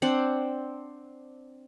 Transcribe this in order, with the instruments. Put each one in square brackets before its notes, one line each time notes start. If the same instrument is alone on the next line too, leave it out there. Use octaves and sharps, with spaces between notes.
[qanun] C4 D4 F#5